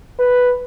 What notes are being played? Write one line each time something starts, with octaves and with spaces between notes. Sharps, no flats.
B4